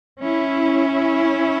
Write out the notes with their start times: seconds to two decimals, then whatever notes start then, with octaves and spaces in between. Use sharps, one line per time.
0.23 C#4 E4